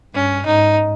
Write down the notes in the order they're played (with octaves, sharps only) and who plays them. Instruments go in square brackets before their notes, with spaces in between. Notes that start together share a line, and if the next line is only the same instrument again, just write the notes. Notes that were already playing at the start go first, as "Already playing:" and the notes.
[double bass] G2 [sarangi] C#4
[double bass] G#2 [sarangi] D#4